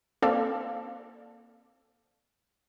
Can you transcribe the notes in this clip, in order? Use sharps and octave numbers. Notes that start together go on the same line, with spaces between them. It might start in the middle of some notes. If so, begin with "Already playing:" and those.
A#3 C4 A4 D5 F5